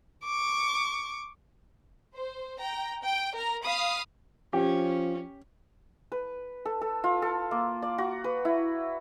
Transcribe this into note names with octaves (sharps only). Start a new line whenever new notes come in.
C#6 D6
C5
G5 A#5
G5 D7
A#4 A#5
F5 B5 D#6
F3 C#4 G4
B4
A4
A4
F4
A4
A#3
D5
F#4
B4
E4